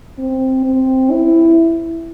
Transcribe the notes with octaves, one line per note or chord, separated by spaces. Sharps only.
C4
C4
E4